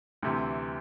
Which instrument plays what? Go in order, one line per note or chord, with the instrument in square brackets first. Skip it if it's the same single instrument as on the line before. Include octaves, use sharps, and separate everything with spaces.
[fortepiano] D2 C3 E3